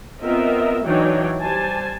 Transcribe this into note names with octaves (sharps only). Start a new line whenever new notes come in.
B3 C4 F4 A#4 D#5 E5
E3 F#3 D4 D#4 C#5 G5
G3 C5 G#5 A5